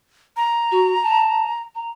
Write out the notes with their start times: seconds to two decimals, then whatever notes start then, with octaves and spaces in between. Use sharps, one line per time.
0.37 A#5
0.72 F#4
1.03 A5
1.75 A#5